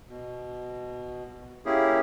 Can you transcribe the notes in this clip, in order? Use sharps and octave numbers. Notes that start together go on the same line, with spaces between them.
B2
A#3 C#4 E4 G4 G#4